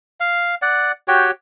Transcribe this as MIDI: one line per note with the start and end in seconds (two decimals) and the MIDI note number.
0.20 0.55 77
0.62 0.92 74
0.62 0.92 78
1.08 1.31 66
1.08 1.31 67
1.08 1.31 73
1.08 1.31 79